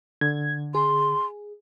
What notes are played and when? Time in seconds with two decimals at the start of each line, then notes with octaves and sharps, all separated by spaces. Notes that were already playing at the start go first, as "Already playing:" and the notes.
0.21 D3 G#6
0.75 G#4 C6